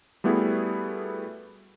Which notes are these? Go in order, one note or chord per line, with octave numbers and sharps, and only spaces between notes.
G3 A3 B3 E4 F#4 G#4